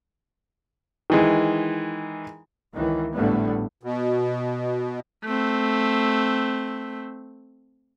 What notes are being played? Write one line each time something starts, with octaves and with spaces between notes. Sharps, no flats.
D#3 E3 G#3
C#2 D#3 E3
G#1 A2 D3 G3 A3 B3
B2
A3 C4